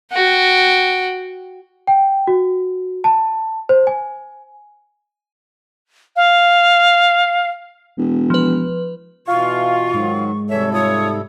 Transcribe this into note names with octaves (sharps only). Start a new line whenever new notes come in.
F#4 G5
G5
F#4
A5
C5
G#5
F5
E1
F3 B4
B2 E3 F4 F5 C#6
G#2 D#3 F#3
C3 E3 G3 A4 C#5 E5
F4 C#5 D#6